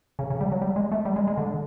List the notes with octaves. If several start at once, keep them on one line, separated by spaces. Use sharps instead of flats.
C#3
C#3
G3
F#3
G3
G#3
A3
G3
G#3
G#3
D3